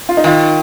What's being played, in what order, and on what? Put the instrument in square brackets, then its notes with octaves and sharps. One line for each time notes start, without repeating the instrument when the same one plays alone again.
[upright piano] F4
D#4
[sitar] D#3 [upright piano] F4